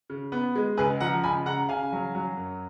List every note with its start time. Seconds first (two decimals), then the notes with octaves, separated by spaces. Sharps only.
0.10 C#3
0.32 B3
0.55 G#3
0.77 C#2 G#4 B4
1.00 F3 F#5 A#5
1.23 C#2 G#5 B5
1.46 C#3 F#5 A#5
1.69 C#3 F5 G#5
1.92 F#3
2.15 F#3
2.37 F#2